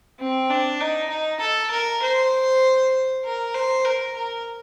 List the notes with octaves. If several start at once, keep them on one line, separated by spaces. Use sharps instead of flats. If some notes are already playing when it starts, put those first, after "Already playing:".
C4
D4
D#4
D#4
A4
A#4
C5
A#4
C5
A#4
A#4